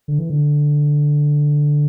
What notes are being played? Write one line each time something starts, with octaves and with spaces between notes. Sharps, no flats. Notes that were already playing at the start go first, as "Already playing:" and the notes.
D3
E3
D3